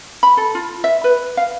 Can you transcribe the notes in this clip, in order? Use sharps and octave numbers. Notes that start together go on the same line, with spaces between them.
B5
A4
F4
E5
B4
F5